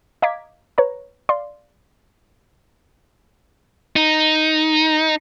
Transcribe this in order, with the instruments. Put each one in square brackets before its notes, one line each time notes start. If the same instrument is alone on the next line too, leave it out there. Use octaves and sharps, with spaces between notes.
[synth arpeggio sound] D#5 F5 A#5 D6 G#6 B6
B4 C#5 A#5
D5 F5 C6
[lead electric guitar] D#4